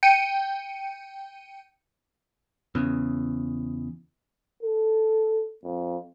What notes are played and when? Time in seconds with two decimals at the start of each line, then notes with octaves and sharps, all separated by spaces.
0.03 G5 C#7 D#7
2.75 E2 C#3
4.63 A4
5.64 F2